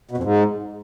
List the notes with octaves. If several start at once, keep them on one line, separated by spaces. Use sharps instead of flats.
B2
F2
G#2